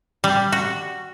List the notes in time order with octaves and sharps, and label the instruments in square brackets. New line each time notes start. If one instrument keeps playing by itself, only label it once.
[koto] G3
F#4